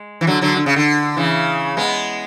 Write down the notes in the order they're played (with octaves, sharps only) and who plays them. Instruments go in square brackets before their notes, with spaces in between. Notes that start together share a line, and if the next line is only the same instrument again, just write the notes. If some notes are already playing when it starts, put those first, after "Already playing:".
Already playing: [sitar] G#3
E3
D3 F#3
D3 F#3
D3
C#3
D3
C#3 E3
G#3 B3